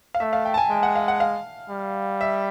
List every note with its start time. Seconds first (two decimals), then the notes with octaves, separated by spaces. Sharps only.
0.15 F5
0.20 A3 E5
0.33 F5
0.46 G5
0.54 A5
0.58 G#5
0.70 G#3 G5
0.83 F#5
0.95 F5
1.08 F#5
1.20 F5
1.70 G3
2.21 E5